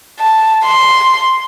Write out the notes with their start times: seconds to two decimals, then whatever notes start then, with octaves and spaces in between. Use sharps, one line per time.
0.19 A5
0.65 C6